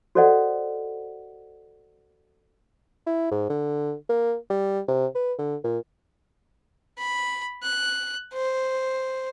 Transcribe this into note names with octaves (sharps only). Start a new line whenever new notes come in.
F#4 A4 C5 D5 D#5 F#5
E4
G#2
D3
A#3
G3
C3
B4
D3
A#2
B5
F#6
C5